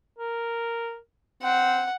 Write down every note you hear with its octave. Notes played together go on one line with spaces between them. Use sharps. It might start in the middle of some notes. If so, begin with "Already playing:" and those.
A#4
C4 F#5